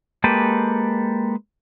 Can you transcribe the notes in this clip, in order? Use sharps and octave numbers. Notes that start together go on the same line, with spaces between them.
G#3 A#3 G4 A4 B4